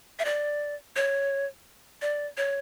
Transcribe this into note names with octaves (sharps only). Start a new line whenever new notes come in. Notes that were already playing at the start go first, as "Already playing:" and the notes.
E5
D5
C#5
D5
C#5